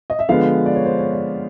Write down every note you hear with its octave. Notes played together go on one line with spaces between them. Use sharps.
D#5
E5
D3 F3 G#3 B3 F5
D5
C#5
C5
C#5
D5